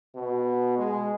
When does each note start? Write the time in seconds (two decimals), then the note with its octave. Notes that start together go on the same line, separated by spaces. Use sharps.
0.15 B2
0.78 G#3